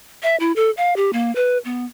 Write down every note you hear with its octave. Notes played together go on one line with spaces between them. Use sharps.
E5
E4
A4
F5
G4
A#3
B4
B3